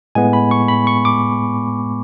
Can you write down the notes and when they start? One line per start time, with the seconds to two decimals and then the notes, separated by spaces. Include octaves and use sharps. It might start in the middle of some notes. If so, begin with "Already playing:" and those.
0.15 A2 G#3 B3 G#5
0.33 B5
0.51 C#6
0.68 B5
0.87 C#6
1.05 D6